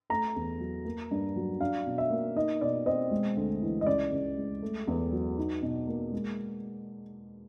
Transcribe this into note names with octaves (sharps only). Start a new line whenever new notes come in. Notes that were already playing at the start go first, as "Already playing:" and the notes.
A3 A#5
E2
F#3
A#3
G2
F#3
D4 F5
B2
E5
A#3
D#4 D#5
B2 D5
C4 D#5
G#3
D2
E3
D#5
C#2 D5
C#2
G#3
A3
E2
F#3
D#4
B2
A#3
G#3